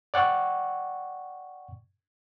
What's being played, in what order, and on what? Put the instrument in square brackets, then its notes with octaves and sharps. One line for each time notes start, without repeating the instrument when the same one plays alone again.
[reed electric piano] D5 F#5 G5 C#6